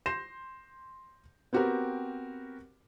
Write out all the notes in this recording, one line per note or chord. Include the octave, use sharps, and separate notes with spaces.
C6 G6 A#6 C7 E7
B3 C4 F#4 G4 A#4